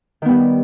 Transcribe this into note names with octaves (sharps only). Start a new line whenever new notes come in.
D#3 G3 B3